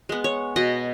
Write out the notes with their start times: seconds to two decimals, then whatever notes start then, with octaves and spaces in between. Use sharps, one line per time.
0.09 G#3 B3
0.24 C#5
0.56 B2 D#5